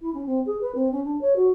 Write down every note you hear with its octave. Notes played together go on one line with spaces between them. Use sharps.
E4
C#4
C4
G#4
B4
C4
C#4
D4
C#5
F#4